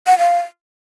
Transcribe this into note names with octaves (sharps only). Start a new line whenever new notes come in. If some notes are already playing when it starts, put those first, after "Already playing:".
F#5
F5